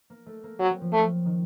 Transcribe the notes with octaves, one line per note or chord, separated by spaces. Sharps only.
A#3
A3
A#3
F#3 C4
F#3
F3
A3
D#3